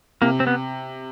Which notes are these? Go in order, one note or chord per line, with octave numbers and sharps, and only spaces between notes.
C3 A#3
C4
B3